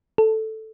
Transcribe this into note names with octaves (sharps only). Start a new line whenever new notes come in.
A4